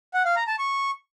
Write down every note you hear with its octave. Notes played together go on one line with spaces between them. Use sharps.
F#5
F5
A#5
A5
C#6